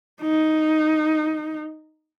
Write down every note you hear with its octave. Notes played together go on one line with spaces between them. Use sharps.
D#4